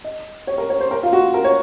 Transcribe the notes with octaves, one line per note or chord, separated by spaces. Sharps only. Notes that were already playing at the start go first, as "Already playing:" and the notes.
D#5
C#5
A#4
C#5
C5
A#4
F4
F#4
A#4
C#5